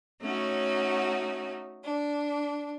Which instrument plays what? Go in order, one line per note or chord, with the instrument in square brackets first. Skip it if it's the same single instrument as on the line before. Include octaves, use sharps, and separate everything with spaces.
[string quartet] A3 C#4 D#4 F#4 C#5
D4